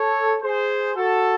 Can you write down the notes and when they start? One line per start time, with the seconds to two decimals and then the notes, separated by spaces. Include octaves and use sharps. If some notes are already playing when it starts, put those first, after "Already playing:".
Already playing: A4 C#5
0.42 G#4 C5
0.96 F#4 A4